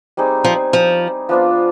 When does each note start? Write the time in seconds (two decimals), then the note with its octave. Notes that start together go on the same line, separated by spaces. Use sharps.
0.17 G3 C4 D#4 G#4
0.44 F3
0.73 F3
1.29 F3 B3 D4 F4